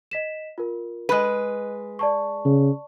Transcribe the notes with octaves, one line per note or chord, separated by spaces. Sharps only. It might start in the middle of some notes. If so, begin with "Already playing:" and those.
D#5 B6 E7
F4 A#4
G#3 B4 D#5 F#6 D#7
D5 A5 C#6
C#3